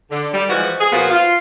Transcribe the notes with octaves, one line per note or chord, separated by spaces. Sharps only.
D3
G3
E3 F3 G#3 F#4
G#4
A#2 F3 B3 F4 F#4
F4